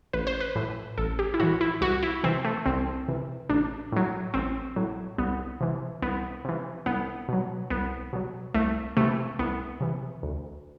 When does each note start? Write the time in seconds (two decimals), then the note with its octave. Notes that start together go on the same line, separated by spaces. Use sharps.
0.13 A1 B4
0.27 C5
0.40 B4
0.55 A2 E3
0.98 A1 A4
1.19 G4
1.34 E4
1.40 A2 E3 F#4
1.61 E4
1.81 C2 F#4
2.03 E4
2.23 C3 E3 C4
2.45 A3
2.66 C2 C4
3.08 C3 E3
3.49 A1 D4
3.92 A2 F#3
4.34 A1 C4
4.76 A2 F#3
5.18 C2 B3
5.61 C3 E3
6.02 C2 B3
6.45 C3 E3
6.86 C2 B3
7.29 B2 F#3
7.70 C2 B3
8.13 B2 F#3
8.54 C2 A3
8.97 C3 E3 A3
9.39 C2 B3
9.81 C3 E3
10.23 D2